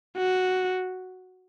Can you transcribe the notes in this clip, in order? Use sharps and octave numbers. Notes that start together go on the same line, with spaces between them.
F#4